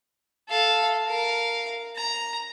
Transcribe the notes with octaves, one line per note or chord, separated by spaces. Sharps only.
A4 F5
A#4 F5
A#5